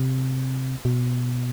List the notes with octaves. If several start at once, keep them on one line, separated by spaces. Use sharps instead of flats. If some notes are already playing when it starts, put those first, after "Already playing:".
Already playing: C3
B2